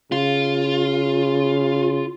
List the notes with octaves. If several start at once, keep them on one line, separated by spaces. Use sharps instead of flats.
C#3 F4